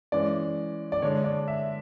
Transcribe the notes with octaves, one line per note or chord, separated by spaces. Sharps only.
E3 G#3 C#4 D5
D5
D3 G#3 D4 C#5
D5
E5